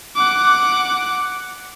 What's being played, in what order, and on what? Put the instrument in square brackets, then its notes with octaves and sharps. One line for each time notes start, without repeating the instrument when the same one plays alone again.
[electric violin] F#5 D6